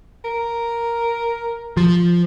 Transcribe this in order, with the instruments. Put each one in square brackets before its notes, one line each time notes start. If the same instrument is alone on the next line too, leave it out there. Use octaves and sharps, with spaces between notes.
[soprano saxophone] A#4
[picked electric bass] F3